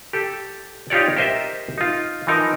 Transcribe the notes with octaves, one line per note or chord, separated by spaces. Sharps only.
G4 A4
D#4 F4 G4 C#5 D5
G4 A#4 C5 D#5 E5
D#4 F4
E3 F3 D#4 A#4